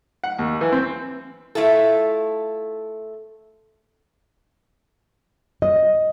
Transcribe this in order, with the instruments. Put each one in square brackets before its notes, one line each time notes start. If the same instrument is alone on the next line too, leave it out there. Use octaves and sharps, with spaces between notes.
[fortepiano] F#5
D#2
E3
C4
[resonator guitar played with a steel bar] A3 E4 F4 A4
[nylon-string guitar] D#5